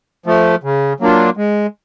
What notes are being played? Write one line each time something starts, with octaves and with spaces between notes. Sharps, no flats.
F3 A3
C#3
F#3 A#3 D4 F4
G#3